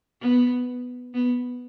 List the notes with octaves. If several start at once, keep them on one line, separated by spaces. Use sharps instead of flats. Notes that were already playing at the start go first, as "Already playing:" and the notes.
B3
B3